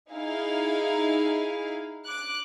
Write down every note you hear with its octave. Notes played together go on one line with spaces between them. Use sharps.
D#4 E4 G#4 F5
D6 F#6